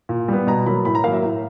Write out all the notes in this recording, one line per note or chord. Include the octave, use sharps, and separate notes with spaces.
A#2
G3 B3
B2 A#5
F#3 A#3 B5
A2 B5
A#5
F#3 A#3 F5
E5
A2